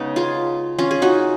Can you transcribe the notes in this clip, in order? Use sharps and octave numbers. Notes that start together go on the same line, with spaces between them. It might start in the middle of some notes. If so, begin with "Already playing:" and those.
Already playing: C#3 G#3 B3 D#4
F4 G#4
C#4 F4
G#4
D#4 F#4